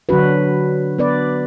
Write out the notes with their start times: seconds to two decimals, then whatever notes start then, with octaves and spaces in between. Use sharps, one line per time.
0.09 D3 F#3 D4 F#4 B4
0.98 B3 D4 B4 D5